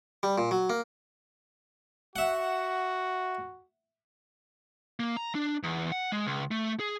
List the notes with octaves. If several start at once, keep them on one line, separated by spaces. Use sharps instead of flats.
G3
A#2
F#3
A#3
F#4 E5 F#5
A#3
A#5
D4
E2
F#5
G#3
C#2
A3
G#4